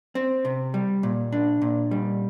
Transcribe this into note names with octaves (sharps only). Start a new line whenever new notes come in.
C4
C3
G3
A#2
D4
A#2
G3